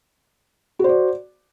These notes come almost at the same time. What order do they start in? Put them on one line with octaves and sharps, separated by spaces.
F#4 C5 D5